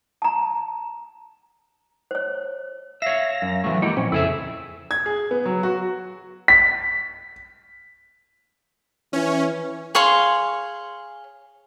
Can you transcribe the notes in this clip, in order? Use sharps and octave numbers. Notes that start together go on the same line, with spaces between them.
A5 A#5
C5 C#5
C#5 E5 F5 A#6
F#2
E3 F#3 A3
G#3 A#3 E4 G4 F#5
A#2 F3 C4 C#4
F2 C#3 E4 G#4 A4 E5
G#6
G#4
B3
F#3
F#4
B6
E3 C#4
G#4 C#5 F5 C6